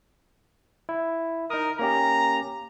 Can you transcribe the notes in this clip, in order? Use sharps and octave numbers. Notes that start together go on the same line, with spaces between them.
E4
D#4 A#4 D#6
A#3 C#4 G4 A#5